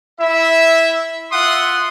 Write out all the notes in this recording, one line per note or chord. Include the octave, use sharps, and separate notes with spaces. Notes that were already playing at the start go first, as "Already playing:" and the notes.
E4 E5
F4 E5 F#5 C6 D#6